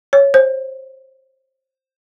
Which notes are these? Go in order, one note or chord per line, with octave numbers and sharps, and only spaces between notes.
C#5
C5